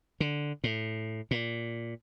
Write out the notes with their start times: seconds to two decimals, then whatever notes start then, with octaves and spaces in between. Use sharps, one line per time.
0.20 D3
0.64 A2
1.31 A#2